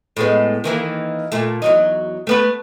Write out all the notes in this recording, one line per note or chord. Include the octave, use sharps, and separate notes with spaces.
A2 G#3 B3
D#3 E3 A#3
A#2 A3
E2 F#3 D#4
A3 B3 B4